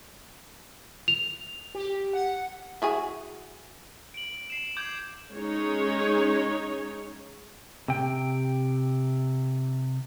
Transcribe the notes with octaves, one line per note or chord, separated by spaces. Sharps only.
F7
G4
F#5
E4 F#4 G#4
D7 F#7
C7 E7
D6 G6 G#6 F#7
G#3 C#4 D#4 G#4 C#5
C3 G5